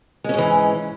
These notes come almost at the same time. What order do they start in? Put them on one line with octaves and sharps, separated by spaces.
G#3 C#4 G#2 E3